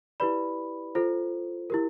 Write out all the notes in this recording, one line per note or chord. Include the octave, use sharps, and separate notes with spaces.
E4 G4 B4 D5 B5
F4 A4 C5
E4 G4 A#4